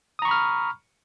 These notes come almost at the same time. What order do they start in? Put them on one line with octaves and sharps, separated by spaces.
D#6 A#5 C#6 B5 F6